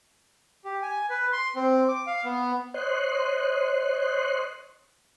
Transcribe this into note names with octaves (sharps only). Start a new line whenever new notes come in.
G4
G#5
B4
C6
C4
D6
F5
B3
C5 C#5 D#5 C6 F#6